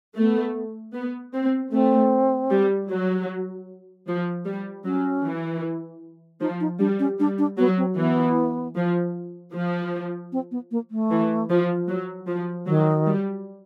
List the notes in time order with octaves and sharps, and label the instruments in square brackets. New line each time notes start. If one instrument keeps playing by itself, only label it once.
[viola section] A3 [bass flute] B3
[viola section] B3
C4
[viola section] A3 [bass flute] C4
[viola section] G3
F#3
F3
G3
[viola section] F#3 [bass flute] C#4
[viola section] E3
[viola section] F3 [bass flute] D#4
[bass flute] D#4
[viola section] G3 [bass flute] D4
[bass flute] C#4
[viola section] G3 [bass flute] D4
[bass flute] D4
[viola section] F#3 [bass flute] B3
[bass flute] C4
[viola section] E3 [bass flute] B3
[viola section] F3
F3
[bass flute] C4
B3
A#3
A3
[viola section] E3
F3
F#3
F3
[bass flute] D#3 [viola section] F#3
[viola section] G3